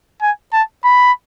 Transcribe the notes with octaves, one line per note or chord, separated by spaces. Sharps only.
G#5
A5
B5